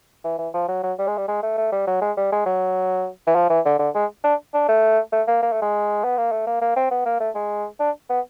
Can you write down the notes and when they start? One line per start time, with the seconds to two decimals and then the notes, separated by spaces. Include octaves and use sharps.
0.24 E3
0.38 E3
0.54 F3
0.68 F#3
0.83 F#3
0.98 G3
1.07 G#3
1.17 G3
1.28 G#3
1.43 A3
1.57 A3
1.72 G3
1.87 F#3
2.01 G#3
2.17 G3
2.32 G#3
2.46 F#3
3.27 E3
3.35 F3
3.50 E3
3.65 D3
3.79 D3
3.95 G#3
4.24 D4
4.54 D4
4.68 A3
5.12 A3
5.27 A#3
5.42 A#3
5.52 A3
5.62 G#3
6.04 B3
6.17 A#3
6.32 A3
6.47 A#3
6.61 A#3
6.76 C4
6.91 B3
7.06 A#3
7.20 A3
7.35 G#3
7.80 D4
8.09 B3